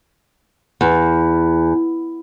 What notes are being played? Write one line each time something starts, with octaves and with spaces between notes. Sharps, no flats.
E2